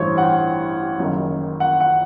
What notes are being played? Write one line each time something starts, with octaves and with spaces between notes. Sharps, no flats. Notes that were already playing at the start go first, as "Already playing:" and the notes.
Already playing: A1 G2 E3 C5 C#5
F#5
G5
F#1 F#2 D#3
F#5
F#5